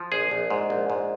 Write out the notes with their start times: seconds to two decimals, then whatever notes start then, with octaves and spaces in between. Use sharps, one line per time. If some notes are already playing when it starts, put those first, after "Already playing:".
Already playing: F3
0.12 A#1 G#4
0.31 A#1
0.50 G#2
0.70 A#1
0.90 G#2